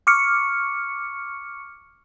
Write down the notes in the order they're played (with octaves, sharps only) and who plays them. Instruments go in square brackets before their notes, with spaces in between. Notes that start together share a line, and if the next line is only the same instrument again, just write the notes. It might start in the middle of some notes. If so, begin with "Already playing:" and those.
[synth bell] C#6 D6 F6 C#7